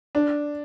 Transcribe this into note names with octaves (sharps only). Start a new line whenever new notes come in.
D4